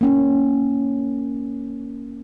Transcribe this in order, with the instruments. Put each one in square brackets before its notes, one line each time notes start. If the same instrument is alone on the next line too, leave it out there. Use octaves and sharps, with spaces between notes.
[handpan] A#3 C#4